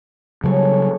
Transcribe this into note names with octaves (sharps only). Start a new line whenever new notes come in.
C#3 F#3 G3 G#4 A4 C#5